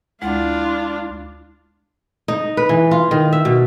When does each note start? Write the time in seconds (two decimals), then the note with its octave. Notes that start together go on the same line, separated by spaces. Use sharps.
0.22 D2 G#3 D4 E4 F4
2.28 D#4
2.57 B4
2.69 E3
2.91 F4
3.11 D#3
3.32 E5
3.45 B2